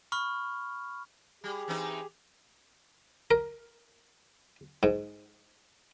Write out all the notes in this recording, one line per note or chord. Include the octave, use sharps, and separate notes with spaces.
B5 C#6 F6
G3 G4 G#4
E3 C4 D#4
A#4
G#2